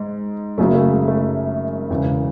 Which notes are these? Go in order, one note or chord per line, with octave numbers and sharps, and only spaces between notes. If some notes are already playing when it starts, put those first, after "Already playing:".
Already playing: G#2 G#3
F#1 F#2 C#3 F#3 A3
A3
G#3
A3
E1 E2 C#3